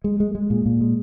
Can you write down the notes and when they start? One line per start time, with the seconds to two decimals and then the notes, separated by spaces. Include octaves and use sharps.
0.04 G#3
0.20 G#3
0.35 G#3
0.50 A#2
0.66 A#2
0.81 G#3